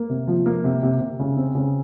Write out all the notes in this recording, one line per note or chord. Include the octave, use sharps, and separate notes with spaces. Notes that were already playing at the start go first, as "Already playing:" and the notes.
Already playing: A#3
C3
F3
A#3
C3
C3
C3
C#3
C4
C#3